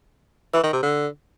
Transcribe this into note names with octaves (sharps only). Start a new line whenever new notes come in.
E3
D#3
C3
D3